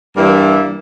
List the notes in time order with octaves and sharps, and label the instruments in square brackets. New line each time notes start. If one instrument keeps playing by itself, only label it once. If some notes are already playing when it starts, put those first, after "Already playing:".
[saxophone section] G2 E3 G3 A#3 E4